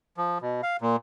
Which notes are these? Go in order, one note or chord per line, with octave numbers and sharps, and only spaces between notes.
F3
B2
F5
A#2